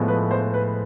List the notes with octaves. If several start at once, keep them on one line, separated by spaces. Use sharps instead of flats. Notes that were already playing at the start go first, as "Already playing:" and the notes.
Already playing: A2 F3 G#3 B3
B4
C5
B4